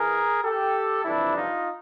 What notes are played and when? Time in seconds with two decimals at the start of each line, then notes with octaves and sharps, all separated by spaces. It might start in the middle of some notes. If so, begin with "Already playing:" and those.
Already playing: E3 G#4 A#4
0.43 G4 A4
1.04 F2 C3 E3 G3 D4 E4
1.35 D#4 F4